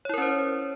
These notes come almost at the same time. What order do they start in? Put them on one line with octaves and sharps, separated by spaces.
C#5 E4 A#4 C#4 C5